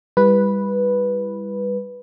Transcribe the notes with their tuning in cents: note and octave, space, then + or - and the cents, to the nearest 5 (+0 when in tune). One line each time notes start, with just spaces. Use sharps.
G3 +25 E4 +10 B4 -5